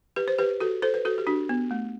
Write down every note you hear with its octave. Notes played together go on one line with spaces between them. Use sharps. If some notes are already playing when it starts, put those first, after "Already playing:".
G4 B4
C5
G4 B4
F#4 A4
A4 C5
B4
F#4 A4
G4
D4 F#4
B3
A3